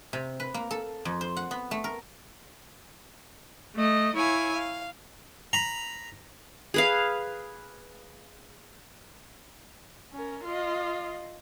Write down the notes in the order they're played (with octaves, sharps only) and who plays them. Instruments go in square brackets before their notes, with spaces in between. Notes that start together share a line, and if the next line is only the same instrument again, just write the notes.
[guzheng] C3
B4
A#3
A4
F2
C5
F#5
B3
A3
A#4
[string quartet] A3 D#5
E4 C#5 F5 G#5
F5
[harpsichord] A#5 B5
[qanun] G#4 B4 F5
[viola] C#4 A#4
F4 D#5